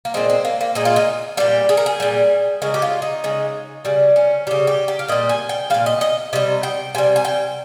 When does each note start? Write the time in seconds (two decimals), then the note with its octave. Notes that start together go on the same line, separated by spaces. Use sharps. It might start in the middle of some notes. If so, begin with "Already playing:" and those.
0.05 A#3
0.14 A#2 G#3 C4
0.30 C4
0.45 A#3
0.61 A#3
0.75 A#2 G#3 D#4
0.85 F4
0.96 D#4
1.37 A#2 G3 G4
1.69 G#4
1.77 A#4
1.86 G#4
2.00 A#2 G3
2.62 C#3 G#3 A#4
2.74 G4
2.82 F4
3.02 D#4
3.24 C#3 G#3
3.85 C#3 G3
4.16 C#4
4.47 C#3 G3 G4
4.67 G4
4.88 G4
4.99 F5
5.08 A#2 G3 D#5
5.29 G#5
5.49 G5
5.70 A#2 G3 F5
5.86 D#5
6.01 D#5
6.33 C3 G3 D#5
6.63 G5
6.95 C3 G3 G#5
7.16 G#5
7.25 G5